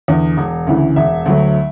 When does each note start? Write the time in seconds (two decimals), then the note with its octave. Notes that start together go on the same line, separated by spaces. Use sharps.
0.08 E2 D3
0.37 E1
0.67 D2 C#3 E3
0.96 E1 E5
1.26 D2 D3 F#3 A3